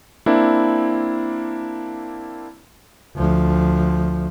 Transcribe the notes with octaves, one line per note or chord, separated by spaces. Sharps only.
A#3 C4 D4 E4
D2 F3